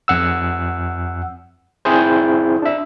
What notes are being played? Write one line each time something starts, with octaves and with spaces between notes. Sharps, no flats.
F2 F#5 E6
C4 E4 G#4 C5
D4 E5